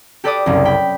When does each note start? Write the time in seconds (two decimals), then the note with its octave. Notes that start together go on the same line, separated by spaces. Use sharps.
0.24 G4 A4 B4 D5 D6 D#6
0.46 F#1 C2
0.65 G5 B5